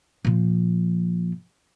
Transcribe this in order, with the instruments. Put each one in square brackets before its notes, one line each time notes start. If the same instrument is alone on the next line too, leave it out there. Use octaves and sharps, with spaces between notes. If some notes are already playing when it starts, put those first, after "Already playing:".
[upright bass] A#2 F3